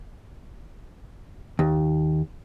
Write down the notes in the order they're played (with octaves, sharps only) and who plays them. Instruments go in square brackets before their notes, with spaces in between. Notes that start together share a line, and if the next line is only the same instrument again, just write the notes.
[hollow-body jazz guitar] D#2